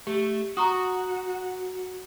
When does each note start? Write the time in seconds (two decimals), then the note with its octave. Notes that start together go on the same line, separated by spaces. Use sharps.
0.07 A3 G4
0.57 F#4 A#5 C#6 D#6